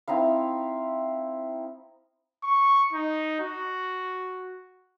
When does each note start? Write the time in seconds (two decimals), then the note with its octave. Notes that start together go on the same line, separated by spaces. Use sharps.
0.08 C4 D#4 E4 F5
2.44 C#6
2.93 D#4
3.40 F#4